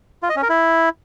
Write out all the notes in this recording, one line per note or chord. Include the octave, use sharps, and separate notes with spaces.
F4
D#5
C#4
A#4
E4